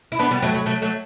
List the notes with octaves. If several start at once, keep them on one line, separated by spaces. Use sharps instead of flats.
E4
B3 D4
G3 B3
F#3 A3
F#3
F#3 A3
F#3 A3